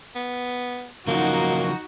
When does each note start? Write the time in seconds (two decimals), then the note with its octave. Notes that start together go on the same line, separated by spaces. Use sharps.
0.15 B3
1.07 C#3 F3 F#3 A#3 D#4 F#4